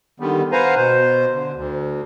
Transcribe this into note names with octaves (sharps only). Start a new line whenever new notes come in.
D3 D#3 G3 B3
B4 C5 F5 F#5 G#5 A#5
B2 C5
D3
D2